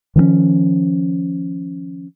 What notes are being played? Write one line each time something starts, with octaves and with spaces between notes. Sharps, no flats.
D#3 F3 A#3 C#4